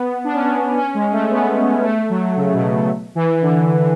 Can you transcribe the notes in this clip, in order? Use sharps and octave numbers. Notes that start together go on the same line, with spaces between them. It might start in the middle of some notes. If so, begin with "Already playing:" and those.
Already playing: B3
D4
C#4
D4
C#4
G#3
A3
B3
A3
F#3
C#3
B2
E3
D3